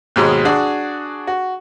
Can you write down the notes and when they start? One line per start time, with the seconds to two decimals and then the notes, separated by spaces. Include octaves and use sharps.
0.16 D#2 G#2 B2 G#3
0.45 D4 F#4 G#4
1.27 F#4